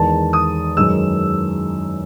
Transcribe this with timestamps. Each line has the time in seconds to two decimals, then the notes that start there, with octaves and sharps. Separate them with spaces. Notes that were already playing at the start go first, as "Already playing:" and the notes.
Already playing: E2 D#3 G#3 A5
0.33 D#6
0.77 F#2 D#3 G#3 E6